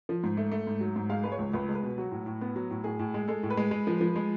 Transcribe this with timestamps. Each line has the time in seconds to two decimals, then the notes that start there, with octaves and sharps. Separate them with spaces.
0.09 F3
0.23 G#2
0.37 A3
0.52 A3
0.67 G#2
0.81 F#3
0.96 G#2
1.10 G#3 F5
1.24 G#3 B4
1.32 C#5
1.39 C#2
1.53 C#2 B4
1.69 G#3
1.75 B4
1.83 B2
1.98 F#3 F#4
2.11 A2
2.26 A2
2.41 B3
2.56 F#3
2.71 A2
2.84 A2 G#4
2.99 A2
3.14 G#3
3.28 G#3 A4
3.43 A2
3.50 B4
3.57 G#3
3.71 G#3
3.87 F3
4.01 F3
4.16 G#3